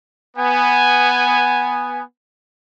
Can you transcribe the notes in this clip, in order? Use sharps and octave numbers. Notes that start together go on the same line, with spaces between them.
B3 G#5